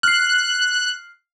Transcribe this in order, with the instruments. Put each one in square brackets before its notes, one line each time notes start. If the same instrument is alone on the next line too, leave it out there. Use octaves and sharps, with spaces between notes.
[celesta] F6 C7 [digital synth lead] F#6